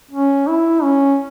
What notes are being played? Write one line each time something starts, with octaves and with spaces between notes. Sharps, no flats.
C#4
E4
C#4